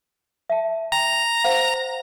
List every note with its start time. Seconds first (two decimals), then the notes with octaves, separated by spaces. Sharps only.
0.50 E5 A5
0.92 G5 A#5
1.44 C5 F5 F#5